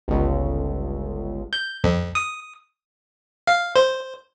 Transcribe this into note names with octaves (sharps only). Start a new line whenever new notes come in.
G1 C#2
G6
F2
D#6
F5
C5